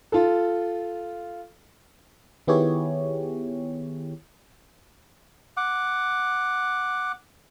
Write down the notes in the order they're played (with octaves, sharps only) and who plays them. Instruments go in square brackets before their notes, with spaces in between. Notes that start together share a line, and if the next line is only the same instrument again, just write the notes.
[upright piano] F4 A4
[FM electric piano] D#3 B3 E4 G4 G#4 C#5
[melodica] F#5 D6